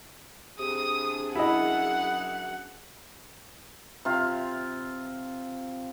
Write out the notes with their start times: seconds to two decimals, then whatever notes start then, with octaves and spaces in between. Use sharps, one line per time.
0.59 C3 D4 G#4 D#6
1.35 F#2 E4 D#5 F#5
4.05 C3 F4